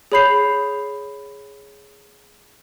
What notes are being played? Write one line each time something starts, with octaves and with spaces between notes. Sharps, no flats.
G#4 C#5 B5 G6 C7 F7